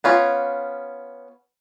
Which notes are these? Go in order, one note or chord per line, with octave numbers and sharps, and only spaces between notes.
B3 C#4 F4